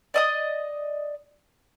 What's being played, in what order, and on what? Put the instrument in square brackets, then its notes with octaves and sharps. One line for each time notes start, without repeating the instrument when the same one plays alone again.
[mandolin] D5 D#5 D#6